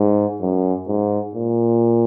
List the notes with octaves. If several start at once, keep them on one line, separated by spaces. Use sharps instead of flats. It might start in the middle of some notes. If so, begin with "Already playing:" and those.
Already playing: G#2
F#2
G#2
A#2